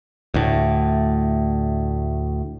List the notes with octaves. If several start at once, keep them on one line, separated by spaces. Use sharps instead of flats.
D2 A2